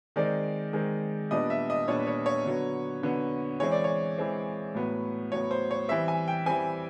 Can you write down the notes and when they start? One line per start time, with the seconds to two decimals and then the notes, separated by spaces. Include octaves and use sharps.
0.16 D#3 G#3 C4 D5
0.73 D#3 G#3 C4
1.31 A#2 G3 B3 D4 D#5
1.50 E5
1.70 D#5
1.88 A#2 G3 B3 D4 C#5
2.07 C#5
2.26 C#5
2.45 D3 F#3 B3
3.02 D3 F#3 B3
3.60 E3 G#3 C4 C#5
3.72 D5
3.84 C#5
4.18 E3 G#3 C4
4.74 A2 F#3 B3
5.32 A2 F#3 B3 C#5
5.51 C5
5.71 C#5
5.89 E3 G3 C4 E5
6.08 G#5
6.28 G5
6.46 E3 G3 C4 G#5